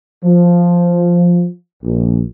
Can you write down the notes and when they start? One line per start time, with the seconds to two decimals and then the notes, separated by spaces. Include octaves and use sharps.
0.24 F3
1.84 A#1